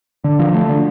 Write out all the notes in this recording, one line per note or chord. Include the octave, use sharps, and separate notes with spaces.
D3
F3
A3
D3